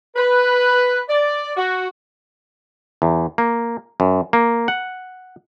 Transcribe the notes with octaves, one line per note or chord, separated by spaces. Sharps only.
B4
D5
F#4
E2
A#3
F#2
A#3
F#5